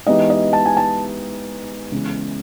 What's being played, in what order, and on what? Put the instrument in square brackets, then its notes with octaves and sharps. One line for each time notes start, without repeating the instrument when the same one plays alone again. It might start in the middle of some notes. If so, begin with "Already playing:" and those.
[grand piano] E3 G#3 B3 D#4 G4 [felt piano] D#5
[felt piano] D#5
A5
G#5
A5
[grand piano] C#3 E3 G#3 B3